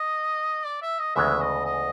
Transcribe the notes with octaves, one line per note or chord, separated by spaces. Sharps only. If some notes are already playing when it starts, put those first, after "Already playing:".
Already playing: D#5
D5
E5
D#5
D2 C#3 E3 G#3 B3 E5
D#5
D#5